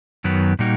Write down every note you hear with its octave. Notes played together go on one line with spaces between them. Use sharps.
F#2 D#3 F#3 B3
A#2 G3 A#3 D#4 F#4